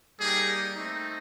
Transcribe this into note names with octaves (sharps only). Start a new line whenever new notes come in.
G3 A#3 D#4 G4 G#4
A3 C4 D#4